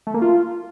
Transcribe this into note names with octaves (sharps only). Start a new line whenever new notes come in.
A3
A#3
F4